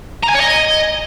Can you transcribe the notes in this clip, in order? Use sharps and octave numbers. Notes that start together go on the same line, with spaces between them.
A#5
G#5
C#5
D#5